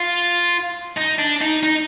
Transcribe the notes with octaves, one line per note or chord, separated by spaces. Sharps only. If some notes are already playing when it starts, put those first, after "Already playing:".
Already playing: F4
D#4
D4
D#4
D#4